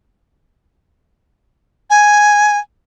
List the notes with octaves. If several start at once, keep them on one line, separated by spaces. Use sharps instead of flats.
G#5